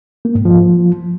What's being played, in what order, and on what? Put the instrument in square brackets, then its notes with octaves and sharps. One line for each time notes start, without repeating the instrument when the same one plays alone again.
[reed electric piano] A#3
G#2
F3